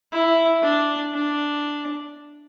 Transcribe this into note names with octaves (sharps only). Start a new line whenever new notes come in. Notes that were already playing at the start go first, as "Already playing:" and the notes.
E4
D4
D4